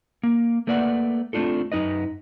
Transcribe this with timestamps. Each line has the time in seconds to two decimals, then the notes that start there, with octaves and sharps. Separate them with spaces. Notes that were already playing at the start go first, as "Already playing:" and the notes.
0.23 A#3
0.67 A3 A#3 B4 D5 E5 F#5
1.33 A3 C4 D4 F4 A4
1.72 F#2 D#4 B4 D#5